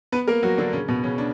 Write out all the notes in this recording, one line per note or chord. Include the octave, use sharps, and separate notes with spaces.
B3 B4
A#3 A#4
F#3 F#4
D3 D4
C#3 C#4
B2 B3
C#3 C#4
D4